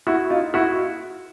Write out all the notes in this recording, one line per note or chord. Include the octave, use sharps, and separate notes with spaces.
E4 F#4
D#4 F4
E4 F#4